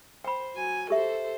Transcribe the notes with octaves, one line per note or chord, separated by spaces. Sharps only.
C5 G5 B5
F#3 G#5
G4 A4 C5 E5